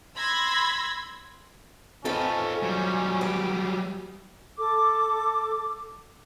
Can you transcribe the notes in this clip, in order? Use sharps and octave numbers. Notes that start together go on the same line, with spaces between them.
B5 C6 E6 G#6 A#6
F2 D#3 F3 C#4 A4 B4
F#3 G3
G4 G#4 B4
A4 D6